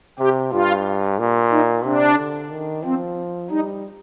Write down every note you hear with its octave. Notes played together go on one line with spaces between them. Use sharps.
C3 G4
G2 F4
A#2
D#4
C3 D4
D3
D#3
F3 C4
G3 D#4